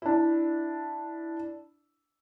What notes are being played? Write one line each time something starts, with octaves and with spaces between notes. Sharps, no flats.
D4 E4